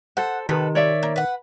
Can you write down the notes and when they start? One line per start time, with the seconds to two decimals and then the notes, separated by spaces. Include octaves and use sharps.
0.17 A4 C5 F#5
0.49 C3 D#3 A4 B4
0.75 C#5 D5 E5
1.03 A#3
1.16 B4 F#5